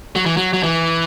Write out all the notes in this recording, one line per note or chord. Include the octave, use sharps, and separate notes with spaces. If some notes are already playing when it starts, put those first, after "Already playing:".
F#3
E3
F#3
F#3
E3